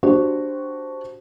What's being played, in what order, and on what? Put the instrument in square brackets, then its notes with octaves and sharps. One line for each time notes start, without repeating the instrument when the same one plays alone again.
[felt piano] D4 F#4 G4 C5